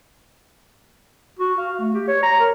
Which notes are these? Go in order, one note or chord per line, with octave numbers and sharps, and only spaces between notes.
F#4
F5
A3
G4
C#5
A#5
A#4